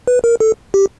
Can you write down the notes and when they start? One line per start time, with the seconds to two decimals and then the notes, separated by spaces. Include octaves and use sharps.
0.08 B4
0.24 A#4
0.40 A4
0.74 G4